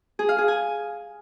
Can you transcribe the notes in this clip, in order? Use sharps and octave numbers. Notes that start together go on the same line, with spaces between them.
G#4
F5
G#4
G#5